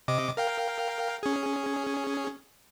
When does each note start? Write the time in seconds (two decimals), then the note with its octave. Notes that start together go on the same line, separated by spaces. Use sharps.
0.08 C3 D#5 D6
0.37 A#4 F5 G5
1.23 C#4 G#4